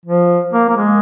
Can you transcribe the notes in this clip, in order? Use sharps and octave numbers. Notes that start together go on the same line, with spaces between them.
F3
A#3
A#3
G#3